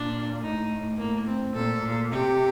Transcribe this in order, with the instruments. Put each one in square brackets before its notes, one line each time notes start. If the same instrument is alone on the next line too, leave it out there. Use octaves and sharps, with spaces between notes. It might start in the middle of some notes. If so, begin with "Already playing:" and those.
Already playing: [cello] A#2 [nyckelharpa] D4
[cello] A2 [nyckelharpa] D#4
[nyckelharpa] A#3
C4
[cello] A#2 [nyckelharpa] A4
[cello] A#2
[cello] C3 [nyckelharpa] G4